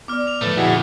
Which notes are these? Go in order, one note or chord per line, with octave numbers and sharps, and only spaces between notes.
B3 D5 D6 F6
F7
A2 D3 F3 A3 B4
F2 A#2 E4 F#4 G#4